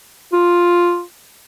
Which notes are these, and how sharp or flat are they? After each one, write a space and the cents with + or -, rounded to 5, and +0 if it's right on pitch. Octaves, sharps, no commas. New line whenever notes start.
F4 +5